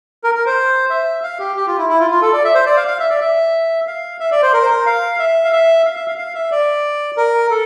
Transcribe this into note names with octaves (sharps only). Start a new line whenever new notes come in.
A#4
A#4
C5
E5
F5
G4
G4
F4
E4
E4
F4
F4
A4
D5
E5
C5
D5
F5
F5
E5
D5
E5
F5
E5
D5
C5
A#4
C5
A#4
F5
E5
F5
E5
F5
E5
F5
F5
E5
D5
A#4
A4